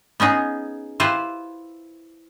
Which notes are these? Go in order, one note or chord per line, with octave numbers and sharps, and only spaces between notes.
B3 C#4 D#4 G#4
E4 F4 G4 B4 C5